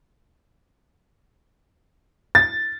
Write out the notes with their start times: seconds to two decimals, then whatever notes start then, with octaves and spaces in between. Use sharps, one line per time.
2.35 A6